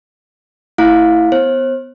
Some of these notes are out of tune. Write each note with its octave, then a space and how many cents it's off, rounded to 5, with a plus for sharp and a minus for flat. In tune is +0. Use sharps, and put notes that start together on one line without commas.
A3 +30 E4 +0 F5 +25
B3 +25 C5 +40